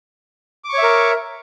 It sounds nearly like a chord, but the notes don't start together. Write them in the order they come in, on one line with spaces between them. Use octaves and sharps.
D6 C#6 C#5 E5 A#4